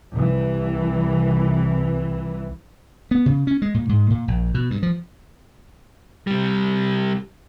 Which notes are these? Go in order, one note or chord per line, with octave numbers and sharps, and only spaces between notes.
C2 E3
B3
C#3
C#4
G#3
A#2
G#2
A#2
A#1
B2
G2
F3
C3 G3